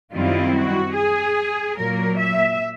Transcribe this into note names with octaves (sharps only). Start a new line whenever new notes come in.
F#2 D#3 G3 C4 E4 F4
F#4
G#4
A#2 F#3 A#3 A#4
E5